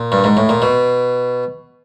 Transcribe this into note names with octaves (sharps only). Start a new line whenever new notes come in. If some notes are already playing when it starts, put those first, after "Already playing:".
Already playing: A#2
G2
G#2
A2
A#2
B2